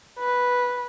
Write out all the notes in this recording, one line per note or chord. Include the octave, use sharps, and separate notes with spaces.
B4